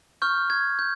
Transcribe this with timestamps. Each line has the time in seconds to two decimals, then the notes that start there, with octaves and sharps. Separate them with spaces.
0.22 C#6 F6 G6
0.50 G#6
0.79 G6